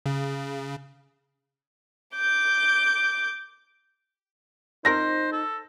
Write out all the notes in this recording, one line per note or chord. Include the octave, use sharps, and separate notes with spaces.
C#3
D6 G6
F3 C4 D#4 A#4 C5 A#6
A4